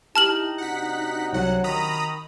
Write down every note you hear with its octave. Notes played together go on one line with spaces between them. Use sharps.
D#4 E4 G4 A5 F6 F#7
C3 D4 F#4 F#5 B6
C2 F#3 F#5
D#3 A#5 B5 D#6